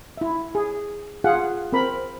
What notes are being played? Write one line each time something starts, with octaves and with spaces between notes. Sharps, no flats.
E4 E5
G#4
F4 G#4 F5 F#5
C4 A#4 B5